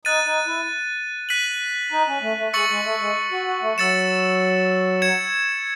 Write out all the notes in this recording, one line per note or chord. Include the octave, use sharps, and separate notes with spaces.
D#4 F#6 A6 D#7
D#4
E4
F#6 B6 D#7 F#7
D#4
C#4
A3
A3
G#3 C#6 E6 A6 C#7 F#7
G#3
A3
G#3
F#4
F#4
A3
F#3 E6 A6 C#7 E7
G#6 C#7 E7